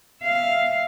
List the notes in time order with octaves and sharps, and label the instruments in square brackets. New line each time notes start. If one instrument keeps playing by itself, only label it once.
[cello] E5 F5